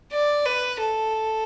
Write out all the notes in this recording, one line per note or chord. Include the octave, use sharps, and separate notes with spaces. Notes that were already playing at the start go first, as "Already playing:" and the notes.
D5
B4
A4